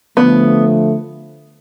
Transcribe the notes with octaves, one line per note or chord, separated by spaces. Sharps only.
D3 F3 A3 B3